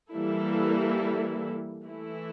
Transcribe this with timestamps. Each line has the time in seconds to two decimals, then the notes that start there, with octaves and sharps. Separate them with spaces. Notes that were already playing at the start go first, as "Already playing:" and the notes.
0.11 E3 G3 A#3 E4 A4
1.84 E3 A3 E4